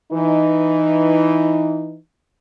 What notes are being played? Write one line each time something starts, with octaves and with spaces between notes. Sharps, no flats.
E3 D#4